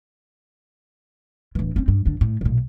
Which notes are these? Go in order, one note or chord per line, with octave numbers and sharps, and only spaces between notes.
D1 E3
C4 C#4
G2
G1 D3
A2
B1 A#2